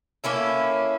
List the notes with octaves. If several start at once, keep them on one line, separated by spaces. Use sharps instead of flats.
A#3 C#4 E4 A4